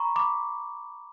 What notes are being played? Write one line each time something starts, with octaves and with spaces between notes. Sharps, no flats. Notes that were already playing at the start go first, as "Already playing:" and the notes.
Already playing: A#5 B5 C#6
B5 D6